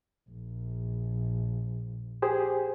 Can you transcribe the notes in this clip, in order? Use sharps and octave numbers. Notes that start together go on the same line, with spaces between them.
A#1
G4 G#4 C5